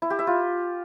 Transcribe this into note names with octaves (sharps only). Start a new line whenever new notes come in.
E4
G4
E5
F4